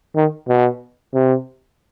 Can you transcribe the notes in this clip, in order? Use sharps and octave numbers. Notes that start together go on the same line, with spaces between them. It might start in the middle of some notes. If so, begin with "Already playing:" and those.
D#3
B2
C3